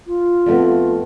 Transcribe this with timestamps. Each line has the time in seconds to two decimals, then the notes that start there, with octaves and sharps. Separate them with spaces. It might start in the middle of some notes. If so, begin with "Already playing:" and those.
0.07 F4
0.46 F2 A3 B3